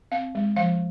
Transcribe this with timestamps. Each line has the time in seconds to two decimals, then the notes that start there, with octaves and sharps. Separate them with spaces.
0.12 C4 F5
0.35 G#3
0.56 F3 F5